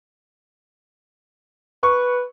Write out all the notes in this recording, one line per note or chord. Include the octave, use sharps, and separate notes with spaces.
B4 C#6